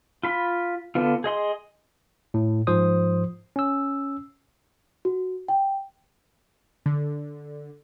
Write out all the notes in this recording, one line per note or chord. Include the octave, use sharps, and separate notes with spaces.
F4 B5
D3 B3 F4
G#4 D#5 C6
A2
G#2 F3 C5 D#6
C#4 E6
F#4
G5
D3